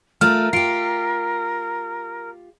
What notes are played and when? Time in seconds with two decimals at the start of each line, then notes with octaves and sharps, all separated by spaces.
0.21 A3 F4 A#4 F6
0.53 F4 G4 C7 D7